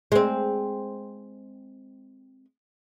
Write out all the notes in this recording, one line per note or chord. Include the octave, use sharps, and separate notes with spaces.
G#3 C4